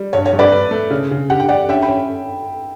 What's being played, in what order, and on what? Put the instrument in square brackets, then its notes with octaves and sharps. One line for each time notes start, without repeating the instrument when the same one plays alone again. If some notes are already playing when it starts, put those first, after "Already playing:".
Already playing: [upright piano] G3
[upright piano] G2 [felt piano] C#5
[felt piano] C#5
[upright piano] G2
[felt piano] B4 D5
[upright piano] B4
A3
C#3
C#3
[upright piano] G4 [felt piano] F#5
[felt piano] G5
[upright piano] G4 [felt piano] D5 F#5
[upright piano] C#4 [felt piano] E5 G5
[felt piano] G5 B5
[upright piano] C#4